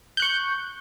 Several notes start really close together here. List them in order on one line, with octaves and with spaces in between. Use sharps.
G6 F#6 C#6